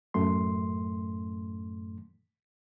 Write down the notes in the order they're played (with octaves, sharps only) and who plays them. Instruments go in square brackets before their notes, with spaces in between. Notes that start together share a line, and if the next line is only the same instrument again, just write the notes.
[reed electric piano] F#2 A2 A3 C6